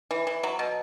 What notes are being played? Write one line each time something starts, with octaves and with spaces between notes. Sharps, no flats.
E3
E3
F#3
B2